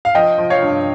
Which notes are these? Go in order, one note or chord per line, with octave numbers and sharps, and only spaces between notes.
F5
F3 D#5 G5
F3
C#5 F5
G2